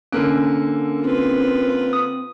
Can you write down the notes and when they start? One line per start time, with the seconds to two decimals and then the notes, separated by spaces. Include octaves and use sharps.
0.12 D3 A#3 C#4 A4 A#4
1.01 C4 F4 B4
1.93 D#6